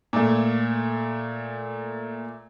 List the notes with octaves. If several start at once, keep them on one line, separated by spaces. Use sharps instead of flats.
A#2 A3